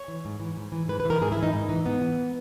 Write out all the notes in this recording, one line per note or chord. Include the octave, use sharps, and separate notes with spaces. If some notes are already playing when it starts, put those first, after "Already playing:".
Already playing: C#5
E3
G#2
E3
G#2
E3
G#2 B4
B4
E3 A#4
G#2 G#4
E4
E3
D#4
G#2
E3 D#4
G#2 B3
E3